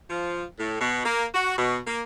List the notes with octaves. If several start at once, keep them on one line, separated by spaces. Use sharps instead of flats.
F3
A2
B2
A#3
F#4
B2
A#3